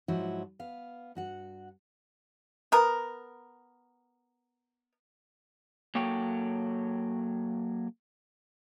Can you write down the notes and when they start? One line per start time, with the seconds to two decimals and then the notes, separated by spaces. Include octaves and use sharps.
0.08 G#2 F3 F#3 E4 F#4
0.59 B3 F5
1.15 G2 F#4 F#5
2.72 B3 A#4
5.95 F#3 A#3 A4 C#5 G5